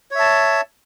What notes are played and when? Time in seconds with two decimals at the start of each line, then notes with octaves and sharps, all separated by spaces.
0.11 C#5
0.15 E5
0.19 A5